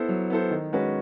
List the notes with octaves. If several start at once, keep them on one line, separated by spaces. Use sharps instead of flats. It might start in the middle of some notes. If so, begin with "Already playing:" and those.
Already playing: B3 E4 A4 C5
F#3
B3 E4 A4 C5
D#3
G#3 C#4 F#4 B4